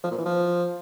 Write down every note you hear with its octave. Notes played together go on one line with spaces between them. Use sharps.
F3
A#2
E3
F3